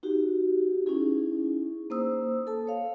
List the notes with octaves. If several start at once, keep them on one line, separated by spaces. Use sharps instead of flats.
D#4 F#4 G4
C#4 D#4 E4 G#4
A#3 C5 D#6 E6
A4 A5
C#5 F5